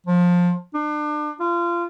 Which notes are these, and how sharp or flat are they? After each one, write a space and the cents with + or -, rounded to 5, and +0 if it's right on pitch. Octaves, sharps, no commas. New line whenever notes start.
F3 +20
D4 +35
F4 -25